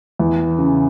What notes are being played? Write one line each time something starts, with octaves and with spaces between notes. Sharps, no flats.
E2
C#3